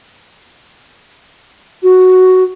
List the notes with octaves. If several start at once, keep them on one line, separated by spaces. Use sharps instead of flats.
F#4